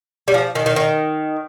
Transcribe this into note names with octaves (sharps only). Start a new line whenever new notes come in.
G3
F3
D#3
D#3
D#3